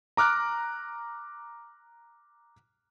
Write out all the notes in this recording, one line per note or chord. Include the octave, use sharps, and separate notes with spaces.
A#5 D6 F6 F#6 D7